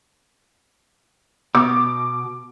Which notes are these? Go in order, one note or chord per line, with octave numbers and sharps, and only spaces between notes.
B2 D6